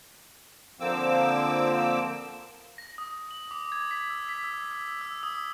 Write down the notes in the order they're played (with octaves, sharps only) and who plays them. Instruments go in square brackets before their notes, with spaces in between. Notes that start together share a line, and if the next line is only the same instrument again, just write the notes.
[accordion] D3 F3 A#3 C4 D6 E6
[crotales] A#6
D#6
F#7
D6
G#6
B6
E6
B6
E6
E6
E6
D#6